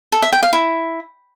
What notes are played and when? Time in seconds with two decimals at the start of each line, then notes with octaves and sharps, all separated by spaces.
0.12 A4
0.22 E5
0.33 G5
0.43 F5
0.53 E4